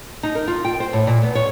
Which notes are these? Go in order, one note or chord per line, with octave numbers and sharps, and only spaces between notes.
D#4
A#4
F4
G5
C5
A2
A#2
B3
C#5